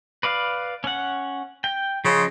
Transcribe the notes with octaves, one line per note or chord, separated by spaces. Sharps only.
B4 D5 F5
C#4 F#5
G5
C#3 F3 C5 D#5